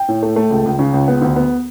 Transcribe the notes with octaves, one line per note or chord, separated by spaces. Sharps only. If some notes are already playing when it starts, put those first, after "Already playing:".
Already playing: G5
A2
A3
A3
C#2
C#2
C#3
C#2
B3
D2
B3